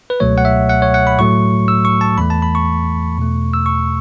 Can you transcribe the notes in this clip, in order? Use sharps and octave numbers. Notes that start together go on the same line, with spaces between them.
B4
C#2 B2 F#3 A3 C#5
F#5
E5
F#5
C#5
F#5
B5
A2 F#3 A3 C#6
E6
C#6
A5
E2 E3 A3 B5
A5
B5
C#6
E2 B2 A3
E6
C#6